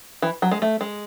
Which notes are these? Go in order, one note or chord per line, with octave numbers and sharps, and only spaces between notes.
E3
F#3
G#3
A3
G#3